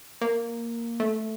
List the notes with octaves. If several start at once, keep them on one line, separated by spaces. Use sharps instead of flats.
A#3
A3